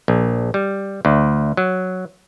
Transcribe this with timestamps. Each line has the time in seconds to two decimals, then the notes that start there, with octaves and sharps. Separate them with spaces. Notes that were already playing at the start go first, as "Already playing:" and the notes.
0.08 A#1
0.54 G3
1.05 D2
1.57 F#3